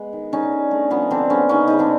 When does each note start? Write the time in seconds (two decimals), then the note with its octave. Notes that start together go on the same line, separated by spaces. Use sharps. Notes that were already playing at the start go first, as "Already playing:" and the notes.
Already playing: G#3 B3
0.13 D#3
0.32 D3 C#4 D#4
0.52 D3
0.71 A3
0.90 F3 B3 C#4
1.10 D3 C4 D4
1.30 D3 B3 C#4
1.49 C#3 C#4 D#4
1.67 C#3 D#4
1.79 C4 D4